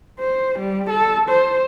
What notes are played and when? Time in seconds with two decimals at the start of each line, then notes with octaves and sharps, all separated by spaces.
0.19 C5
0.59 G3
0.89 A4
1.29 C5